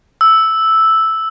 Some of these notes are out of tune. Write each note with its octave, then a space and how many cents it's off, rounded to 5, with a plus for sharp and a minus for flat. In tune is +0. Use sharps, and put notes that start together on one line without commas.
E6 -5